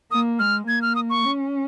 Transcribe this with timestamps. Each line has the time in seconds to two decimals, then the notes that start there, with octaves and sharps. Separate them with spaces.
0.11 A#3 D#6
0.39 G#3 F6
0.67 A#3 G#6
0.82 F6
0.96 D#6
1.10 C#6
1.25 C#4